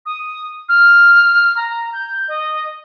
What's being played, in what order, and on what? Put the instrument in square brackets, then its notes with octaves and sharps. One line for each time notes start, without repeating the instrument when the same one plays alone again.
[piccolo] D#6
F6
A#5
G6
D#5